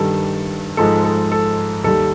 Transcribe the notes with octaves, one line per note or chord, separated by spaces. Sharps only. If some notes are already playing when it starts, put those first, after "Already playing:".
Already playing: G2 D#3 G3 A4
G#2 F3 G#3 A4
A4
A4
D#2 D#3 G3 A4